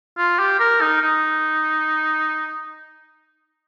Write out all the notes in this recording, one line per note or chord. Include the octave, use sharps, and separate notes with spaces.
F4
G4
A#4
D#4
D#4